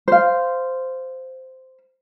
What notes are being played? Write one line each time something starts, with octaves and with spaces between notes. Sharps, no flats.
C5 F5